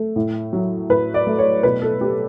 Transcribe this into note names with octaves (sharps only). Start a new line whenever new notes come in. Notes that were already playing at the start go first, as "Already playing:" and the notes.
Already playing: A3
A2
F#3
A2 B4
D5
A3
C#5
B2 B4
A4
A3 G4